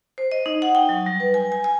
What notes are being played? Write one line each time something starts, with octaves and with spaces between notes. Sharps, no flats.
C5
D#5
D#4
F#5
G5
F#3
G3
B4
G#5
G#5
G#5